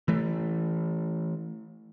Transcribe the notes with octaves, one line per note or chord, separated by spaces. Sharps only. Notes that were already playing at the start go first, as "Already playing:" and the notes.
E3 A3